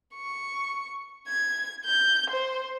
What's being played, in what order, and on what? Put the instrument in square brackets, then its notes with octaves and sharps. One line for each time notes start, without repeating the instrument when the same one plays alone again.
[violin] C#6
G#6
G6
C5